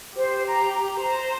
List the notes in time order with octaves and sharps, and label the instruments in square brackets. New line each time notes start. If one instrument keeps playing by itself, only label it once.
[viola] G4 [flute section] C5
[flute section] A#5
A#5
[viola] C5 [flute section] A#5